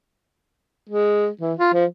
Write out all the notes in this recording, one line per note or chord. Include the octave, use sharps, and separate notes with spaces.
G#3
E3
F4
F3